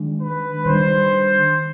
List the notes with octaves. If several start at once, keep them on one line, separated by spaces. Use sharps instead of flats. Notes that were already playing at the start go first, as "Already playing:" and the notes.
Already playing: D#3 G#3 D4
B4
D#3 G3 D4 C5